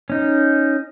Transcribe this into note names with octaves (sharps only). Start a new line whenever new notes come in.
C#4 D#4